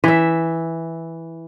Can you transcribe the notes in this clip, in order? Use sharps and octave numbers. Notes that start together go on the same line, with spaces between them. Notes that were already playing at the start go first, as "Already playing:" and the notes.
E3 E5